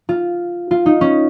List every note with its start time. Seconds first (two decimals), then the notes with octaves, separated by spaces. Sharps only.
0.09 F4
0.71 F4
0.86 D#4
1.01 C#4